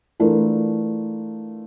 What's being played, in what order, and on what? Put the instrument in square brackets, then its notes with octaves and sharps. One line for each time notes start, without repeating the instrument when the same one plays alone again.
[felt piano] E3 A3 D4 F4 A#4